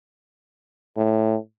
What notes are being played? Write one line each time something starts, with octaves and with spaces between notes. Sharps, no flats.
A2